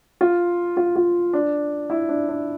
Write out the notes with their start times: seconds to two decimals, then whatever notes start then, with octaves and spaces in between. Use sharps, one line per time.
0.21 F4
0.77 F4
0.96 F4
1.33 D4
1.90 E4
2.09 D4
2.28 D4